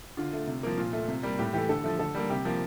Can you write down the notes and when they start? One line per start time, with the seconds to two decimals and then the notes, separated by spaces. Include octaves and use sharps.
0.17 D3 F4
0.33 A3
0.47 C3
0.63 F3 A#3
0.78 A#2 F4
0.93 A3
1.08 C3
1.23 G3 A#3
1.39 A2 G4
1.53 E3 A3 G4
1.69 D3 A4
1.84 F3 A3
1.99 D3 A4
2.15 G3 A#3
2.30 C3 G4
2.45 F3 A#3